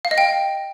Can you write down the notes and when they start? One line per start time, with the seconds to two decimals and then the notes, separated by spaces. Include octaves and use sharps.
0.05 F5
0.11 D#5
0.18 G5